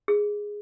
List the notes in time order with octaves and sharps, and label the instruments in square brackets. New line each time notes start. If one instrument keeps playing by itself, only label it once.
[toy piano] G#4